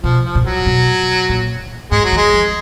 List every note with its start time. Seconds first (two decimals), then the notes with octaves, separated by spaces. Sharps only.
0.03 B2 F3
0.24 F3
0.35 A#2
0.46 F#3
0.66 B2
1.29 A#2
1.91 G#2 G#3
2.05 F#3
2.13 D#3
2.17 G#3
2.33 F3